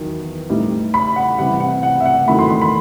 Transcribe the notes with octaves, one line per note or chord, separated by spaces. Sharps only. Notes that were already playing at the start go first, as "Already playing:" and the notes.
Already playing: E2 D#3 F#3
A2 G3 D#4
B5
F#5
C3 E3 G3 F#5
F#5
F#5
E5
F#5
E2 D#3 F#3 A3 E4 B5
C6
C6
B5